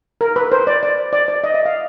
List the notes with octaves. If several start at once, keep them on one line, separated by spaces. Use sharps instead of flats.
A#4
B4
C5
D5
D5
D5
D5
D#5
E5
F5